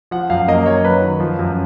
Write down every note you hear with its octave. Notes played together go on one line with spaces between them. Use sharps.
F3 F#5
F#2 F5
A#3 D#5
F#3 C#5
F#3 B4
D#3
F3
F#2